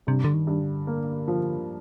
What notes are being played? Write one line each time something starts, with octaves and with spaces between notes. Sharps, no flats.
G2 C3
D3
D#3
G2
D3
A#3
F3